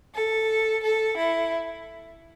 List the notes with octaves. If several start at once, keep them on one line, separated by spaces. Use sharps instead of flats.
A4
A4
E4